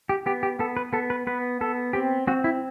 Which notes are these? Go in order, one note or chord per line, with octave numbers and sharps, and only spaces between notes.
G4
B3 G4
G4
B3 A4
B4
B3 A4
B4
B3 B4
B3 A4
C4 G4
C4 F#4
E4